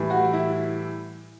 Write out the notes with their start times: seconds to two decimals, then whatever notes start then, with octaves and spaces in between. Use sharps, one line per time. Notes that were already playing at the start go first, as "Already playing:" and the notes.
Already playing: A2 E3 G3
0.10 F#4
0.33 E4